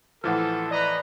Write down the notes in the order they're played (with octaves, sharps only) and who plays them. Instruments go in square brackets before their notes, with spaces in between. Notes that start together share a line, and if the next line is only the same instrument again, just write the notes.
[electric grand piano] A2 E3 F3 [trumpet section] A4 [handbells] F#5 D6 F6
[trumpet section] B4 D#5 A#5 [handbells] D5